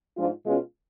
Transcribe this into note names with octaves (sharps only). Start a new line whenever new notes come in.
G#2 F3 G#3 D4 F4
B2 G#3 C#4 F4